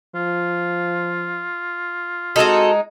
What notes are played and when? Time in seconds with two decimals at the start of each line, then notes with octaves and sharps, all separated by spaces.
0.15 F3 F4
2.36 G#3 C4 D#4 F#4 A4